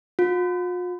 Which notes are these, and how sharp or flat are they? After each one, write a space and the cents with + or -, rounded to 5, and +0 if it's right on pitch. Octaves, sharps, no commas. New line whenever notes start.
F4 +45